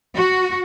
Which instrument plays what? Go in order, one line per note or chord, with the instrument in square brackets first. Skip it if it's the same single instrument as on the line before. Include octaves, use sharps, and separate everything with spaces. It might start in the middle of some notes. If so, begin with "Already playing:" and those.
[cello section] F#4